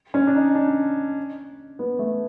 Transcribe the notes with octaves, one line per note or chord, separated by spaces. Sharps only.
C#4
D4
D#4
D4
B3
A3